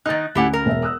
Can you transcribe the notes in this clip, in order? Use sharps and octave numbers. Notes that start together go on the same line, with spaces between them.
D#3 D#4 F#6 A6
D2 C#4 E4 G4 F#5 G#5
A#4
E1 E5
D#6 E6 F#6